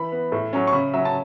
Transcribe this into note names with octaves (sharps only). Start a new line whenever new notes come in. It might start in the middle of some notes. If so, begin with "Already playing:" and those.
Already playing: E3 B5
B3
A2
F#3 C#4
C#6
C#3 B5
F#3 C#4 E5
A5